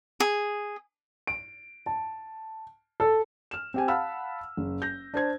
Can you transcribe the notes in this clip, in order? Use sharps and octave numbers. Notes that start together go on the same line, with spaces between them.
G#4
D7
A5
A4
F6 E7
C4 G4 G#5
F5 F#5 A5 B5 E6 F6
F#1
G6 A#6
D4 C5 G#6